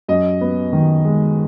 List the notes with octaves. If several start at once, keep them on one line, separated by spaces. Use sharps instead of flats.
F#2 D#5
B3
D#3
G#3